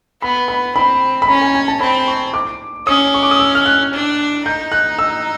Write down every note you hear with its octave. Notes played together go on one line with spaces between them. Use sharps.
B3 B5
B5
C4 B5
B5
C#4 A#5
G#5
G#5
A5
C4 B5
C#6
D6
C#4 D#6
C#6
D6
D#6
E6
F6
F#6
D4
D#4 G6
F#6
E6